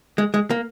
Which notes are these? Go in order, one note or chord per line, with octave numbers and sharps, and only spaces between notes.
G#3
G#3
A#3